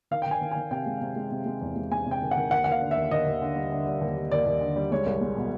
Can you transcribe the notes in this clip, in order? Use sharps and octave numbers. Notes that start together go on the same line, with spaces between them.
D#3 F5
G5
D#3 G#5
D#3
D#3 G#5
C3 G5
G#3
C3
G#3
C3
G#3
E2
G#3
G#3 G#5
C3 G5
D#3
F#5
D#3
D#2 F#5
F#5
D#2 F5
D3
E5
D#2
D#2 D#5
D#2
D3
G3
D3
G3
D#2
G3
D#2 D5
D#2
D3
G3
G#3 C#5
C2
G#3
B2